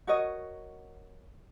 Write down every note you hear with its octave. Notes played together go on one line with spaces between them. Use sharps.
F#4 A#4 C#5 D#5